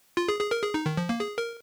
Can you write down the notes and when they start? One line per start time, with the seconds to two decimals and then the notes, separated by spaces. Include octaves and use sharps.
0.17 F4
0.28 G#4
0.40 G#4
0.51 A#4
0.63 G#4
0.74 D#4
0.86 D#3
0.97 F3
1.09 A#3
1.20 G#4
1.38 A#4